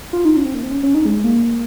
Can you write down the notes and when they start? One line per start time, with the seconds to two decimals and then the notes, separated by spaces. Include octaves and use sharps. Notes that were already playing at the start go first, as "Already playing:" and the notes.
0.13 F4
0.25 D#4
0.36 C#4
0.45 C4
0.55 A#3
0.63 C4
0.71 C#4
0.83 C#4
0.94 D#4
1.06 G#3
1.24 A#3